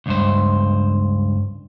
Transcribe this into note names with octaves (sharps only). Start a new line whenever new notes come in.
C#2 G2 C5